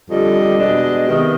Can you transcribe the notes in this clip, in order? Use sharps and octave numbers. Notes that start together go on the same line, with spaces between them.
F2 D3 G3 D#5
B2 G#3 D4
C3 D#3 B3